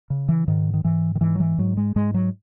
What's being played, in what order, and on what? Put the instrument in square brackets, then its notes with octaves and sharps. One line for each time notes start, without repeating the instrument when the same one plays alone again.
[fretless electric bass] C#3
E3
G#2 D#3
D#3
G#2 E3
D#3
G#2 E3
F#3
E3
G#2 F#3
G#3
G#2 G#3
F#3